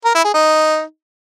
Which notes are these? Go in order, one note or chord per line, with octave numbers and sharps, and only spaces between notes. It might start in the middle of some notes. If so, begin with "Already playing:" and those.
A#4
E4
G#4
D#4